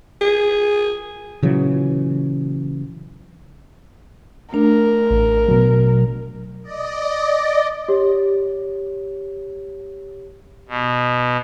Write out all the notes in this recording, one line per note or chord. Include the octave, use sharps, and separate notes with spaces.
G#4
A#2 C#3 E3 F#3
A3 D4 A#4
A1
B2 F#3
D5 D#5
G4 C#5
B2